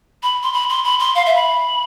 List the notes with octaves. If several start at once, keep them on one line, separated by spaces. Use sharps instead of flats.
B5
C6
B5
C6
B5
C6
F5
E5
B5